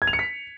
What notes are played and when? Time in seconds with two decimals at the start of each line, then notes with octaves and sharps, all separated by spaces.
0.02 G#6
0.07 F7
0.13 C#7
0.19 B6